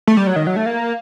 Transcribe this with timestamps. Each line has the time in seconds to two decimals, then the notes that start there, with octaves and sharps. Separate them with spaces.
0.07 A3
0.17 G3
0.27 F#3
0.36 D#3
0.47 F#3
0.56 A3
0.66 A#3